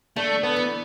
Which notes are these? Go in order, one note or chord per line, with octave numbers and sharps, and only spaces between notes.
D3 A3
B3
E3